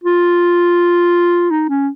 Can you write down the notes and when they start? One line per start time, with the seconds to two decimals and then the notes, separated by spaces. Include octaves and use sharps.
0.04 F4
1.51 D#4
1.69 C#4